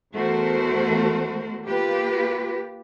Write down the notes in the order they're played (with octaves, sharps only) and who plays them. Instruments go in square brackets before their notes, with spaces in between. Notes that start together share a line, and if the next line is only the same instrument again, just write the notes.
[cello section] E2 A3 F#4 A#4 C5
A#3 F4 G4 B4